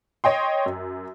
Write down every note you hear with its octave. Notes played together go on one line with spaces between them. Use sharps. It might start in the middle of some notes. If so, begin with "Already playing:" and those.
C#5 D#5 G5 C6
F#2